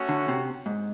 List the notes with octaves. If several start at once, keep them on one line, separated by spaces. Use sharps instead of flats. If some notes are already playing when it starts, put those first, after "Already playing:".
Already playing: A3 C#4 F#4
D3
C3
G#2